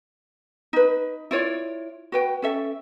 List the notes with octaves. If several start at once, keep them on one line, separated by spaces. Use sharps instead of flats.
D#4 B4
E4 F4 C#5 D5
F#4 B4 G5
C#4 A4 E5